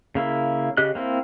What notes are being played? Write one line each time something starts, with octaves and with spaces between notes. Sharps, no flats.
C#3 A#3 E4
C#3 G4 D#5 F#6
A#3 C4 E4